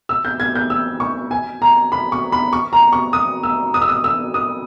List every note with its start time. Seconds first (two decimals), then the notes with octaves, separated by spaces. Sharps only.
0.09 E6
0.25 G6
0.40 G#6
0.55 G6
0.70 E6
1.00 C#6
1.31 G#5
1.62 A#5
1.92 B5
2.12 C#6
2.32 B5
2.53 C#6
2.73 A#5
2.93 C#6
3.13 D#6
3.43 E6
3.74 D#6
3.82 E6
3.89 D#6
4.04 E6
4.34 D#6